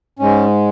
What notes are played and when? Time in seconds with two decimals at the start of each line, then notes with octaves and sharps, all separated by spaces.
0.19 G#2 G#3 C#4